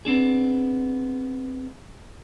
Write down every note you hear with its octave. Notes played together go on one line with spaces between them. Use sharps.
B3 C4 D4 G#4